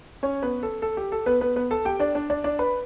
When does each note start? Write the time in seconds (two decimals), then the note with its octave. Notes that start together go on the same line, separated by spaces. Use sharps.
0.23 C#4 C#5
0.42 B3 B4
0.63 A4
0.82 A4
0.97 G4
1.12 A4
1.26 B3 B4
1.41 B3 B4
1.56 B3 B4
1.71 A4 A5
1.85 G4 G5
2.00 D4 D5
2.15 D4 D5
2.30 D4 D5
2.44 D4 D5
2.59 B4 B5